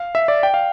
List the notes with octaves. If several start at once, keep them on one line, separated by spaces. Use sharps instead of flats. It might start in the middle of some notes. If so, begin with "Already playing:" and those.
Already playing: F5
E5
D5
G5
F5